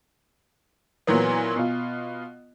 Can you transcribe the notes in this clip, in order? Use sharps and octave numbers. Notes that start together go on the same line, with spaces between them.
A#2 E3 F#3 B3
B2 F4